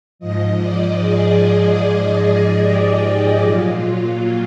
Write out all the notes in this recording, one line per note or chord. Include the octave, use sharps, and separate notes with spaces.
G#2 F3 D#5
D5
G#4
G4
A#2 F#3 F4